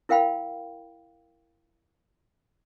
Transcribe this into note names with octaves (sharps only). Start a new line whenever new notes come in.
E4 A#4 F5 G5 B5